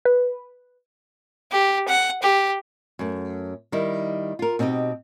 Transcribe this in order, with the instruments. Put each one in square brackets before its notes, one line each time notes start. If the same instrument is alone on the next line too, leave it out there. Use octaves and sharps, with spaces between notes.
[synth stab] B4
[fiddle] G4
F#5
G4
[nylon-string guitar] F#2 A3
D#3 G3 D#4 E4
F4 A#4
B2 C4 D#4 G4 D#5